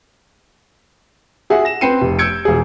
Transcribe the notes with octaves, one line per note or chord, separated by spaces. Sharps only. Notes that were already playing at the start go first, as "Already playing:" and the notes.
F#4 G#4 E5 F#5
A#6 E7
C4 B4 G5 C7 C#7 D#7
F1
E6 G6 G#6 C#7 D7
E1 G#4